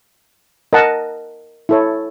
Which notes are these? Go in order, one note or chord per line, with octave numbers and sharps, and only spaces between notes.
A#4 D#5 F#5 A5
E4 A4 C#5